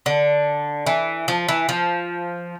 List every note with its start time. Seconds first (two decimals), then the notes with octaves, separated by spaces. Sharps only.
0.06 D3
0.86 E3
1.28 F3
1.49 E3
1.69 F3